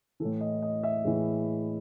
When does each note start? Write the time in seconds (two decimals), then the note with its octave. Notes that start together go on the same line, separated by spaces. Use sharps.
0.20 E3 A4
0.25 A2
0.41 D#5
0.62 D#5
0.83 E5
1.04 A2 E3 G#4